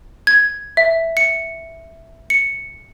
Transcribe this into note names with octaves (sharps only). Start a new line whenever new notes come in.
G#6
E5
C#7
C#7